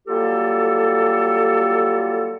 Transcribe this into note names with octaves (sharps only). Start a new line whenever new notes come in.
F#3 G3 A#3 F4 G4 A4